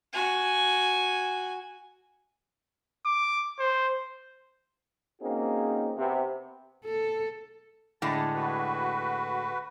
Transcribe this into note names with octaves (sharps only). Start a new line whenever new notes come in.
F#4 G#5
D6
C5
A#3 C4 C#4 D#4 F#4 G#4
C3 B3 C5
A4
A2 D3 G#3 A5
F#4 B4